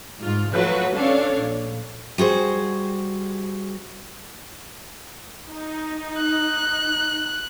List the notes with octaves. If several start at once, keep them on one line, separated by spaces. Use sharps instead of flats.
G#2 F4
F3 F#3 A3 F#4 B4
C#4 D4 A4 C#5 D5 F5
A#1
G3 F#4 G#4 C5
D#4
F#6